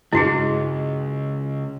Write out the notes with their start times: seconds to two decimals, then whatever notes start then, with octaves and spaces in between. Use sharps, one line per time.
0.12 C#2 G2 G#3 E4 F#4 G#4